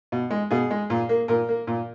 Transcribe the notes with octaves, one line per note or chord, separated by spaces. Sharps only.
B2
G#3
B2 G#4
G#3
A#2
A#3
A#2 A#4
A#3
A#2